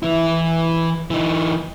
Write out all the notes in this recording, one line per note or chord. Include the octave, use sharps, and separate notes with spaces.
E3 E4
E3 D#4